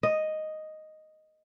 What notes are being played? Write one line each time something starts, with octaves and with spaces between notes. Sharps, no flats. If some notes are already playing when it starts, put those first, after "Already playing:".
D#5